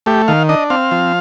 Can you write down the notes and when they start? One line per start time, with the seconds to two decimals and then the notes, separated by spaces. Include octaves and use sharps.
0.06 A3 G4
0.28 D#3 F5
0.49 D4 D#5
0.70 C4 F5
0.91 F3